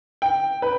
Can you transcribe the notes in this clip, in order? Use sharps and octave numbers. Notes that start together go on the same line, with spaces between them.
G5
B4